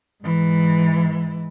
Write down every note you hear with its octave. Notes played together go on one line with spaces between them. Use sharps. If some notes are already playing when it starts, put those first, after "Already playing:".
G#2 E3